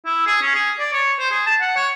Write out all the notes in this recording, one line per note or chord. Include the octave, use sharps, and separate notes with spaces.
E4
G#4
C#4
G#4
D5
C#5
C5
G#4
A5
F#5
C#5